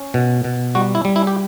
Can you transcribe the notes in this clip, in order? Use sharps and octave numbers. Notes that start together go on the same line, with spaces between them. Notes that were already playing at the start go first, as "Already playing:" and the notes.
Already playing: C#4
B2
B2
G3 F#4
E4
G3
E4
G4